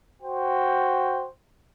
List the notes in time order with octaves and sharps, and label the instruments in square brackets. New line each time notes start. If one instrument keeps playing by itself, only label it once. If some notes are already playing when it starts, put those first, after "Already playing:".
[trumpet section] F#4 C5 G5